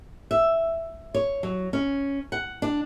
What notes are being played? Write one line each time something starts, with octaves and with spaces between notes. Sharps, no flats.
E5
C#5
F#3
C#4
F#5
D4